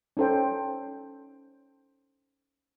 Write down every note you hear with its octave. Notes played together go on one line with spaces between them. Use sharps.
C#4 D#4 A4 C5 G5